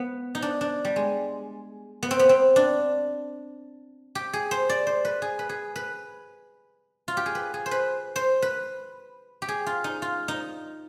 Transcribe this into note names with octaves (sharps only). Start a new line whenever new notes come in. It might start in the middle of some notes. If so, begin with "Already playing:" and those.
Already playing: B3
D#4
D4
D4
G3
G#3
B3
C4
B3
C4
D4
G4
G#4
C5
D5
C5
B4
G#4
B4
G#4
B4
F4
G4
G#4
B4
G#4
C5
B4
C5
B4
G4
G#4
F4
D#4
F4
D#4